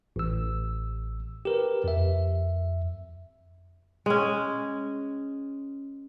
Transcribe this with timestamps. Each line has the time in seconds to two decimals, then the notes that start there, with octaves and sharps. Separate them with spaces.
0.16 A1 E6
1.45 G4 A#4 B4
1.84 F2 E5
4.06 G#3 C#4